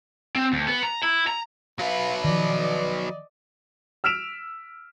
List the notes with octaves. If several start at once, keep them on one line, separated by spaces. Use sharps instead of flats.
C4
D2
B3
A#5
E4
A#5
F#3 B4 E5 F5
D#3 F3 D5 D#5
E6 F6 B6 D7 E7 F7